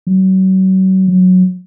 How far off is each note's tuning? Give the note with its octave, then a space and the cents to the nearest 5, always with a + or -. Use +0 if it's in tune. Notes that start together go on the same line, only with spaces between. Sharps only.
F#3 +35
F#3 -10